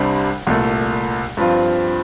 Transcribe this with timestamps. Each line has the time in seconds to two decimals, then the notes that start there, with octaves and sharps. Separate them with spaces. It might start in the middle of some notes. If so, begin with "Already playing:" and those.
Already playing: C2 C3 G3 D4
0.47 C2 A#2 A3
1.37 G2 F3 C4 F4